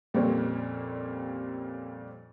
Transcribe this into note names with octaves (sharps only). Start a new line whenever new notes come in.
F2 A#2 G3 A#3 C4 C#4